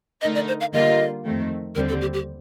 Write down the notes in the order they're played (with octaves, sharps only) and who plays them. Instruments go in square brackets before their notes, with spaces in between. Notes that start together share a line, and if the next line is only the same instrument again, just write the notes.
[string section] D3 A3 D#4 A#4 [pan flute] D#5
[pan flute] D5
C5
F5
[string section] D3 G3 A#3 F4 A#4 [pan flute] D#5
[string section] F2 D#3 A3 C4
[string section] D#2 D3 G3 C4 [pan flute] A#4
[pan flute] A4
G4
G4